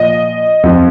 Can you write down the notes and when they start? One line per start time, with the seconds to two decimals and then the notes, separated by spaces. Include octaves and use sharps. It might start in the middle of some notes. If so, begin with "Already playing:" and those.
Already playing: A#2 F3 D#5
0.63 F2 F3